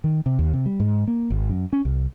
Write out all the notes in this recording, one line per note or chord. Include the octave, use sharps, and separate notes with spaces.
D#3
C3
D#2
C3
G3
G#2
A#3
G#1
F#2
C#4
C2